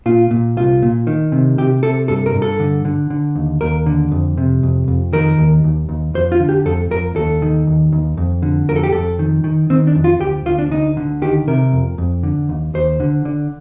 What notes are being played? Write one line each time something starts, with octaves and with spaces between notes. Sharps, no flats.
A#2 F4
A#2
C2 F4
A#2
D#3
C3
C3 G4
C3 A4
G2 A4
A#4
G2
A4
D3
D3
D3
D#2
D#2 A#4
D3
F2
C3
F2
F2
D#3 A#4
D#2
D#2
D#2
F2 C5
F4
D3
G4
F2 A4
F2 A#4
D#2 A4
D#3
D#2
D#2
F2
D3
F2 A#4
A4
G4
F2 A4
D#3
D#3
D#3 C4
D4
F2
F4
D2 G4
D2 F4
D4
D2 D#4
D3
D#3 G4
C3 A#4
F2
F2
D3
D#2
D#2 C5
D3
D3